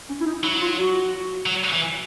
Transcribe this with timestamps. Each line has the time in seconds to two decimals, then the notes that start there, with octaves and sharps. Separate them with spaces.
0.09 C#4
0.21 E4
0.26 D#4
0.43 F#3 E4
0.61 F4
0.78 F#4
1.46 F#3
1.73 E3